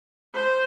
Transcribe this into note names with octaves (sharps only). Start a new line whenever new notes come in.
C5